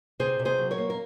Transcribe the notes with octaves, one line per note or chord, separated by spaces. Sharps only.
C3 G#4 C5
C3
G#4 C5
F#3
A#4 C#5
A#3
A#4